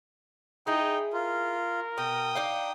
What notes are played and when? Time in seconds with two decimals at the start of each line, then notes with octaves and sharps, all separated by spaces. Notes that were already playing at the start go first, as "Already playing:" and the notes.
0.67 D#4 E4 G#4 G5
1.13 F4 A#4
1.98 B2 G5 D#6
2.35 D4 D#4 F5